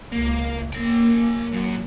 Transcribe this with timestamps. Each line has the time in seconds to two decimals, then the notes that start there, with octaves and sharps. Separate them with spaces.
0.12 C#2 A#3
0.73 A#3 C#4 G5
1.52 F#2